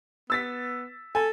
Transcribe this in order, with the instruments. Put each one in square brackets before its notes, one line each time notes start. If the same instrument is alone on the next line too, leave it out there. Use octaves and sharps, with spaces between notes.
[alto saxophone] B3 [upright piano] E6 A6 B6
[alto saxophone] A4 [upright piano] G#5